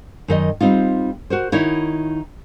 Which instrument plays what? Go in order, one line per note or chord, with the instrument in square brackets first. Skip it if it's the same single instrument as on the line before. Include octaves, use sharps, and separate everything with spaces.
[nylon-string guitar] F#2 D#3 D#5
G3 C4 D#4 F4
F#4 A#4 C5
D#3 D#4 E4 F#4 C#5